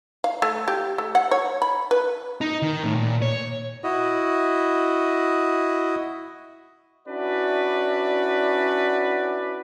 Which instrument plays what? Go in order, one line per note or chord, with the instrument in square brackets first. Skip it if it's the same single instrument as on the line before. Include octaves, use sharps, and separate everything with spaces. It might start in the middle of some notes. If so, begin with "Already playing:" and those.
[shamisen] F5
A3
G4
A3
F#5
C#5
B5
B4
[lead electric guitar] D#4
D#3
A2
A#2
C#5
[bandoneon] E4 F#4 D#5
[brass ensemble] C#4 D4 E4 F#4 B4 D5